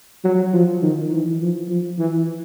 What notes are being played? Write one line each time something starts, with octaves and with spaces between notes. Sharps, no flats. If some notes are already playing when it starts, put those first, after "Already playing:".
F#3
F3
D#3
E3
F3
F3
E3